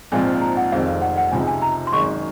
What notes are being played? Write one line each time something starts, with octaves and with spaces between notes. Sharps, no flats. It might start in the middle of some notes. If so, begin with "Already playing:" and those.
A#1 G#2 F3 C4 F4 G#5
A#5
F#5
F1 F2 D#3 G#3 C4 F5
F#5
F#5
C#2 C3 F3 G#3 D#4 G#5
G#5
A#5
C6
G#1 F#2 D#3 G#3 C#6